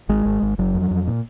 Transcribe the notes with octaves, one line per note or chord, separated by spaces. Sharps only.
G#1 G#3
G#1
G#1
F#1 F#3
F2
F2
A#2